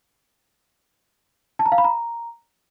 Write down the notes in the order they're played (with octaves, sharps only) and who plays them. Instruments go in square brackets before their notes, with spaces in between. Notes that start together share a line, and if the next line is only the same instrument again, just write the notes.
[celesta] A5
A#5
F5
B5
A#5